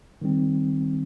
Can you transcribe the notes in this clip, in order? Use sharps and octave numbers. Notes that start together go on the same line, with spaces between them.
D#3 G3 C4